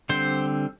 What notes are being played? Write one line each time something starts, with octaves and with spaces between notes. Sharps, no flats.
D3 G3 C4 C5